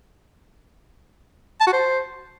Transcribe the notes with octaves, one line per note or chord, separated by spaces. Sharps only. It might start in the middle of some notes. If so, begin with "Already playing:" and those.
A5
F#4
C5